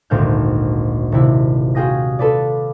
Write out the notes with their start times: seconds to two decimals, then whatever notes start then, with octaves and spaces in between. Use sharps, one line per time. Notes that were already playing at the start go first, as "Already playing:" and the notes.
0.10 G#1 D2 A#2 F6 G6
1.12 D#1 C3 E4
1.75 F4 F#4 G#4 G5 D#6 A#6
2.19 F4 A4 B4 D5